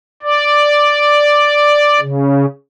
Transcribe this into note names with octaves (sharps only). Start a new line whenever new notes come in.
D5
C#3